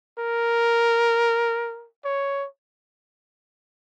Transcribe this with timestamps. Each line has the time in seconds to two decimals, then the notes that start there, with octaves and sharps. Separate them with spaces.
0.19 A#4
2.05 C#5